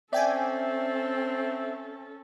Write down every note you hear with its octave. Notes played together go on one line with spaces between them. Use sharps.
C4 C#4 A4 D5 E5 G5 G#5